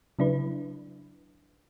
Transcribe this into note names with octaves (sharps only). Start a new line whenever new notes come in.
C#3 F#3 D4 E4 B4